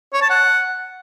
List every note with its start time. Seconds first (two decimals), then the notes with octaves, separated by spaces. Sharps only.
0.13 C#5
0.22 A5
0.30 F#5